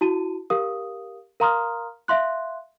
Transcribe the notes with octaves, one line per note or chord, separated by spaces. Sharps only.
E4 F#4 A5 D#7
G4 A#4 F5 D#6
A#4 F5 A#5 C6 D#6 F6
E5 F5 C6 F#6